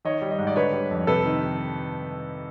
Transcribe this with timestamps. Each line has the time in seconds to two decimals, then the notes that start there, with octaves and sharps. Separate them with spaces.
0.05 D#3 C#5 D#5
0.22 G3
0.31 C#5 D#5
0.39 G#2
0.47 D5
0.56 D3 B4 C#5
0.73 G3
0.91 F2
1.07 C3 A4 B4
1.25 D#3